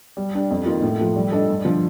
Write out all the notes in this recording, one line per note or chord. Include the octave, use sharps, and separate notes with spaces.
G3
D4 G4
F2
D#3 A#3 F4
A2
F3 A3
G3
D4 A4 D#5
G2
D3 F3